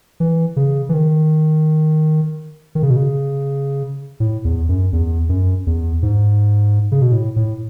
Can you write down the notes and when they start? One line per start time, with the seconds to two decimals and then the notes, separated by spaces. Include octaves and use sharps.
0.20 E3
0.56 C#3
0.89 E3
0.93 D#3
2.75 D#3
2.83 C#3
2.90 B2
2.96 C#3
4.20 A2
4.45 E2
4.69 F#2
4.93 E2
5.29 F#2
5.67 E2
6.03 G#2
6.92 C#3
7.02 B2
7.12 A2
7.36 A2